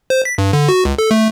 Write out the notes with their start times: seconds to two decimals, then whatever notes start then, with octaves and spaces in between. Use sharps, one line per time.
0.10 C5
0.25 B6
0.38 G2
0.53 D3
0.69 F#4
0.85 C#2
0.98 A4
1.11 A3